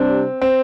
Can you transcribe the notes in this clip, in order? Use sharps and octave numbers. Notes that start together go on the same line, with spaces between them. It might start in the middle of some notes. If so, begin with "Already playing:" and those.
Already playing: C3 G3 C4 D4
C4